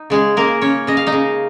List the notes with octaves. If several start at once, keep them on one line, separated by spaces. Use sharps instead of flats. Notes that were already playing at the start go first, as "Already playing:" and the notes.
Already playing: D#4
C#3 G#3 G#4
C#3 A#3 A#4
C#3 C#4 C#5
C#3 D#5
F5
D#4 D#5
C#3